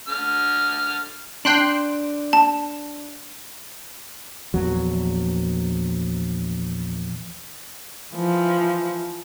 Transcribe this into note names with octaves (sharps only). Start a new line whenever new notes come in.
D3 F6
D4 G5 C6 F#6
A5
A#1 E2 F#3
E3 F3